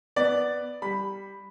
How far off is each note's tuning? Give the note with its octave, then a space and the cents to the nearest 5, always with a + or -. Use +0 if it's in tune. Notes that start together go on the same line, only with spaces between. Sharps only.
B3 +0 D5 +0
G3 +0 B5 +0